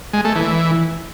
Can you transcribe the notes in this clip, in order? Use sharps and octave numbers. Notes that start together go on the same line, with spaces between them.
G#3
A3
E3